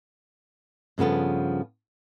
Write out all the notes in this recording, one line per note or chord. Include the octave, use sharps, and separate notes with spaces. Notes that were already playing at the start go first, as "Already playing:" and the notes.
G2 C#3 F3 B3 A4